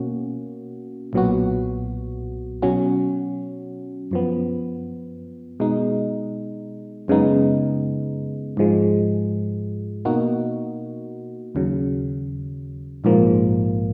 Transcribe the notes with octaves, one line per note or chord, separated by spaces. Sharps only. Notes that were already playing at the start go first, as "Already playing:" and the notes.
Already playing: B2 A#3 C#4 F#4
B1 A#2 F#3 B3 F#4
B2 F#3 C#4 F#4
F#2 F3 B3
B2 G#3 D#4
F#2 C#3 G#3 B3 D#4
G#2 F3 G#3
B2 A#3 D#4 F#4
D#2 C#3 F#3
A#1 G#2 F3 A#3